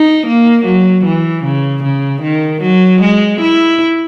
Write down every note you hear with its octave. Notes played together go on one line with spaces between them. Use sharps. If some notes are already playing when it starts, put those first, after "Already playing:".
Already playing: D#4
A#3
F#3
E3
C#3
C#3
D#3
F#3
G#3
E4